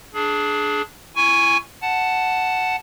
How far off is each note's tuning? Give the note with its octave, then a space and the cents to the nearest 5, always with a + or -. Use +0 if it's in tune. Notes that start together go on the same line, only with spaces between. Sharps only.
D4 +0 G#4 +25
E4 +35 G#5 -10 C#6 +0
F#5 +0 A5 +0